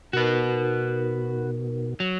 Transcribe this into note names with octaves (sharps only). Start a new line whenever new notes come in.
B2 D#4 F#4 A#4 B4
F#3